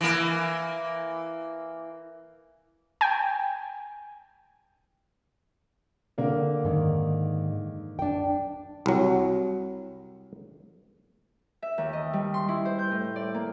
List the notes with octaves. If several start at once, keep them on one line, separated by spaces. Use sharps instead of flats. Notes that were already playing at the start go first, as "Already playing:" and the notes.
E3 A#3
G5 G#5
D3 A#3 A#4
G#2 D#3
D4 G5
C2 F#3
E5
D#2
D#5
G3
C6
E4
C5
G6
A2
D5
A#3